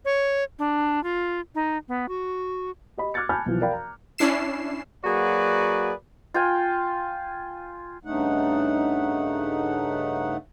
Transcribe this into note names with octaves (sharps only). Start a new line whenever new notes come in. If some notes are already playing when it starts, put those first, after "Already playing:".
C#5
D4
F4
D#4
B3
F#4
G4 D#5 B5
D6 F6 F#6 G#6 A6 C#7
G#5 A5 B5 F6 G6 A6
B1 E3 F3
A#4 D5 F5 G5 B5
A#5
C#4 D4 E4 C7 E7
F#3 A#3 F#4 G#4 B4 D5
F4 G5 G#5
G2 C#3 A3 D#4 F#5